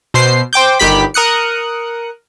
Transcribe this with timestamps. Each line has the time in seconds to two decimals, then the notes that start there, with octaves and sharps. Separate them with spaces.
0.14 B2 C5 C7
0.53 C5 G5 D6 G6
0.79 G1 D#3 G4 B5 B6
1.14 A#4 D#6 F#6 C#7